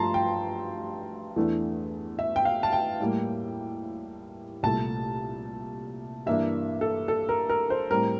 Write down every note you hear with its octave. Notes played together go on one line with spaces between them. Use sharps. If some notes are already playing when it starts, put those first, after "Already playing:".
Already playing: G2 F3 A3 A5 A#5 C6
G5
E2 E3 A3 D4
E5
G5
F5
A5
G5
A2 G3 A#3
C2 A#2 A3 A5
G2 E3 A#3 D4 E5
A4
A4
A#4
A#4
C5
A2 G3 C4 A#4